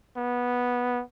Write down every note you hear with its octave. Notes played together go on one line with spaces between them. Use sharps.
B3